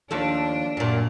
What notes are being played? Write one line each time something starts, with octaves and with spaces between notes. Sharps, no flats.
D#2 F3 D4 A4
F#2 A#2